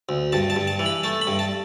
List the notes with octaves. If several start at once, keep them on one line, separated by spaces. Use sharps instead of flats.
D2
G2 A5
A5
G2
A5
E3
B5
A3 A5
B5
G2
A5